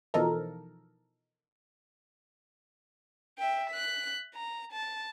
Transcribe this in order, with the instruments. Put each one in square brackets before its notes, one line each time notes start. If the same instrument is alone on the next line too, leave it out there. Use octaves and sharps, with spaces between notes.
[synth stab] B2 E3 F3 D#4 A4 A#4
[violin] E5 G5
F#6 B6
A#5
A5